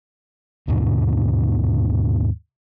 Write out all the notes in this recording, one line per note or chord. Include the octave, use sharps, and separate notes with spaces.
D#2 G#2 B2 D3